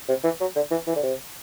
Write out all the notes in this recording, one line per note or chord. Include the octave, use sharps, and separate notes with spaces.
C3
E3
F#3
D3
E3
E3
D3
C3